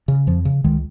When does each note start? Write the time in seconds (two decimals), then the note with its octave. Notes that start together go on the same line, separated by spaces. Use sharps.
0.08 C#3
0.27 F2 F3
0.45 C#3
0.64 C#2 D#3 G#3